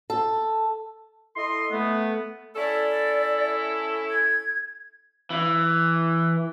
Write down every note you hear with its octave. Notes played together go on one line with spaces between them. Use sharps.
A4
E4 A4 D#5 C6
A3 B3
C#4 E4 A4 D5
G#6
E3